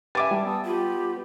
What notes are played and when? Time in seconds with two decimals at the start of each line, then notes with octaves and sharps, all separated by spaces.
0.15 G4 B4 E5 G#5 D6 A6
0.31 G3 D5 A5
0.45 B3 A5 D#6 E6
0.65 F4 G4 B5